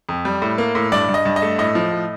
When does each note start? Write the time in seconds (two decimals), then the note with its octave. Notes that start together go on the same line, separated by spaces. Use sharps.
0.09 F2
0.25 G3
0.42 A2
0.58 A#3
0.75 A2
0.92 G2 D5
1.09 G2
1.14 D#5
1.25 G2
1.36 D#5
1.42 A3
1.59 A2 D#5
1.75 F3
1.92 A2